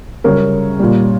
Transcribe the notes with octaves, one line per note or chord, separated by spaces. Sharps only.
F#2 C#3 G3 A#4 C#5
A#2 G3